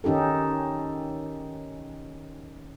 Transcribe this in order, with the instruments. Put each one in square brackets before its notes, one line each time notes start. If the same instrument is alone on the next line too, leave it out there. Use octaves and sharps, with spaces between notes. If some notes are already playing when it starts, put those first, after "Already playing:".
[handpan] D#3 C#4 D#4 G4 A4